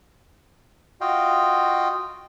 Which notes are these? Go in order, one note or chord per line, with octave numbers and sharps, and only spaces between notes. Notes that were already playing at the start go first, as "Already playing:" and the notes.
F4 F#4 D#5 F5 G5